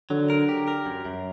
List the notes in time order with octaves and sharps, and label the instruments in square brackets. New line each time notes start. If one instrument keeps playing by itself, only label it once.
[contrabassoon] D3 [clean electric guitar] F#3
[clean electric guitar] A#4
G4
A#4
F#2
F#2